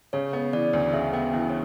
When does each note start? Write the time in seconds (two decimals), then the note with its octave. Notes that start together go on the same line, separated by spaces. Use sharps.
0.13 C#3 C#5
0.33 B3
0.53 E3 D5
0.73 D2
0.93 C#3 E5
1.13 B3 G5
1.34 E3 E5
1.49 C#5